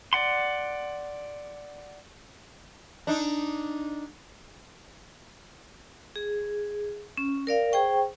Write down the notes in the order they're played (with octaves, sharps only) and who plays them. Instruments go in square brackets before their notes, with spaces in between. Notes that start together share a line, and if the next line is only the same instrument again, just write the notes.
[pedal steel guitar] D5 F#5 C6
[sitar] D4 D#4
[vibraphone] G#4
C#4
A#4 D5 F5
G#4 C5 G5 C#6